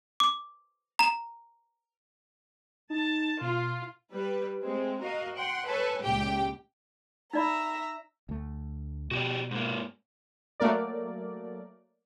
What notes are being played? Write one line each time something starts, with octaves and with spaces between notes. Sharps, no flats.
D6
A#5 E7
D#4 A5
B2 F4
G3 B4
G#3 A3 C4
F#4 A#4 D#5 F5
F#5 G5 C6
A4 B4 C#5 G#5
C#2 A#2 G4 G5
D#4 D5 E5 A#5 B5
D2 A3
B2 F#4 G4 D5
G#2 A#3
F#3 A3 A#3 A#4 D5